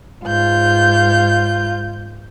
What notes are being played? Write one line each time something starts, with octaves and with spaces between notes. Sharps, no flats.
G#2 F4 G6